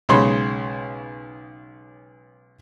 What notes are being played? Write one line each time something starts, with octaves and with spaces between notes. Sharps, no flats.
B1 C#3 G#3 C#5 B5 C6